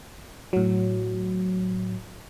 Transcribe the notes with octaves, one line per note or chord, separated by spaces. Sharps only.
A2 F#3